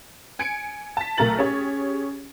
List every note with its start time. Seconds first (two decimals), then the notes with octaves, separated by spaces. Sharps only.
0.39 G#5 G#6 C#7 D7
0.97 A5 B6
1.17 B1 A3 A#4 A#5 A6 F#7
1.39 C#4 G4 G#4 C#5